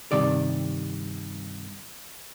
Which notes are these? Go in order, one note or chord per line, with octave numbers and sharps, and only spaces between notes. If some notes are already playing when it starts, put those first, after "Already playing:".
G2 C3 D#3 D5